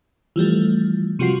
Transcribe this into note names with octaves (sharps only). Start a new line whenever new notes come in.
E3 F3 G3 A3
C3 F3 G3 F4 F#4 C7